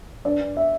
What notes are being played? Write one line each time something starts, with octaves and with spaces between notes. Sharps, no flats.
G2 D5
G2
E5